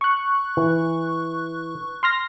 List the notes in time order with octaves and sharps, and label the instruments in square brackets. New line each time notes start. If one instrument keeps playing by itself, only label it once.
[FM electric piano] C#6 F#6
[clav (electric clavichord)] E3
[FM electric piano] C6 F6 A#6